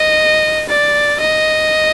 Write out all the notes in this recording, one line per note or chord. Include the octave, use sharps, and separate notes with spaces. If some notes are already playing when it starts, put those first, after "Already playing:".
Already playing: D#5
D5
D#5